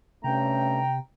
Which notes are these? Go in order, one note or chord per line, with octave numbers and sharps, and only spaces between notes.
G2 C3 A3 C#4 G5 A#5